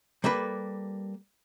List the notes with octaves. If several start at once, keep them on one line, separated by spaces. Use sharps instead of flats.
G3 A#3 A4 B4